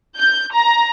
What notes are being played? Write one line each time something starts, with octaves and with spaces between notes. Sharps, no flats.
G6
A#5